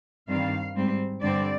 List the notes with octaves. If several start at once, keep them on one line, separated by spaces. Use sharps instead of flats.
G2 D#3 G3 C4 F5
G#2 G3 C4
G2 D3 G3 C4 D5